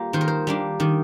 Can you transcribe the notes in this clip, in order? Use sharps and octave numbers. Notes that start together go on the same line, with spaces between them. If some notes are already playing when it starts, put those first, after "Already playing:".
Already playing: G3 A#3 F4
D#3 C5
A#4
C5
G3 A#3 D4
D#3 D5